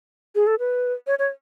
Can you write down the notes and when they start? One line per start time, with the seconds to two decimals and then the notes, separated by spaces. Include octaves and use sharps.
0.35 G#4
0.47 A4
0.59 B4
1.07 C#5
1.19 C#5